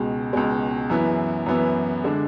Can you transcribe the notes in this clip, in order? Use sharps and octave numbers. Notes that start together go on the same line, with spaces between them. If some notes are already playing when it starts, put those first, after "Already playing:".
Already playing: C#2 B2 G#3
C#2 B2 G#3
F#2 E3 B3 E4
F#2 E3 B3 E4
D3 G#3 D4